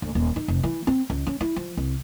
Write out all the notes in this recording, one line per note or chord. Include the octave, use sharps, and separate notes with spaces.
D2
D#1
D#4
F1
E3
C4
C#2
C#4
E4
F3
C2